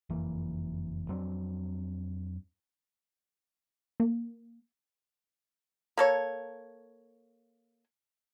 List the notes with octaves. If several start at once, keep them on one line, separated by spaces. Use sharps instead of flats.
F#1 F2 E3 A#3
F2 F#3 C4 D4
A#3
A#3 A4 C#5